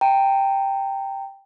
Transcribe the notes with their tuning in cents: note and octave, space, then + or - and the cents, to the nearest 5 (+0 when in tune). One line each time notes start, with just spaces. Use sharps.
G5 +0 A#5 -30